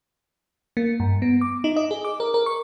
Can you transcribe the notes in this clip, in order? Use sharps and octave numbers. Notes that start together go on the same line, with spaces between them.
A#3
G2
B3
D6
D#4
D#5
G#4
D6
A#4
A#4
C#6